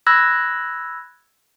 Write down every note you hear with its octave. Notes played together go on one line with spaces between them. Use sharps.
B5 E6 F#6 G#6 A#6